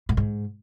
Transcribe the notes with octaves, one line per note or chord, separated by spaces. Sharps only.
A2
G#2